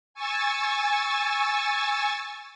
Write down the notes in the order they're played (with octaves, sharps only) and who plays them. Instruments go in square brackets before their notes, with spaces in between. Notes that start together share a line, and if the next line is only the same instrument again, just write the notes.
[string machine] G#5 C#6 E6 A6